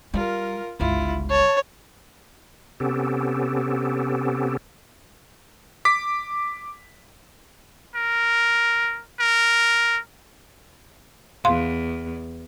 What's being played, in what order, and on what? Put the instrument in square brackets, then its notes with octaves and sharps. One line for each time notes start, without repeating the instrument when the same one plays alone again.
[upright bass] G3 [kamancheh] F4 A#4
[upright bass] G1 C#2 [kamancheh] E4 F4
[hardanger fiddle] C#5 [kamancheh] A5
[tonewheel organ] C3 B3 C#4 G4 A4
[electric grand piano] D6 B6
[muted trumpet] A#4
A#4
[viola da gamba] E2 [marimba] F5 C6